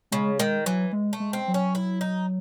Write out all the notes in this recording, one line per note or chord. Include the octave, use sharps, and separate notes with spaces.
C#3 G#3
D#3 G#3
E3 F#3
G#3
A3
G#3
C4
F#3
C#4
E4
D#4